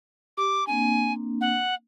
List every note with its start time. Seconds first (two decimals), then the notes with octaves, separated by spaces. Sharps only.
0.37 G4 D6
0.67 A#3 C4 D4 G#5
1.41 F#5